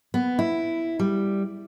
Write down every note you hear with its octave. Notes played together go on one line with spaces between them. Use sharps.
B3
E4
G3